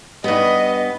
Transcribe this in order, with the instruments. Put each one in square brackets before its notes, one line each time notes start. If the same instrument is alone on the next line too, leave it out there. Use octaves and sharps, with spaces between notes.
[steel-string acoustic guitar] G2 B3 [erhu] D#5